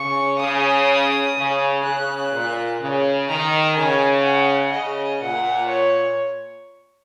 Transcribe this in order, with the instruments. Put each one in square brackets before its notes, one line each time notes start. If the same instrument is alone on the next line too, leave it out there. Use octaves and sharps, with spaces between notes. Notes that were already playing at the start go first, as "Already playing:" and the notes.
Already playing: [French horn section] C#3 [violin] C#6
[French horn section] C#3 [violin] D#6
[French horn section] C#3
[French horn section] C#3 [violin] F#6
[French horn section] A#2
C#3
[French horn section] D#3 [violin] A#5
[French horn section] C#3 [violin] G#5
[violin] F#5
[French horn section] C#3 [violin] D#5
[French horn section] A#2 [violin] F#5
[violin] C#5